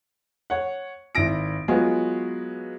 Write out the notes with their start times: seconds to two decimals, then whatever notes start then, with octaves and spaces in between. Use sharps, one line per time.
0.50 C#5 F#5
1.15 G#1 E4 A#6 D7
1.68 F#3 G#3 B3 F4 F#4